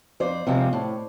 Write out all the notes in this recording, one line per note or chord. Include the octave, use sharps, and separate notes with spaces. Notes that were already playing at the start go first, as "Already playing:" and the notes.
F2 C5 D5
C3 F3 G#3 C4
A2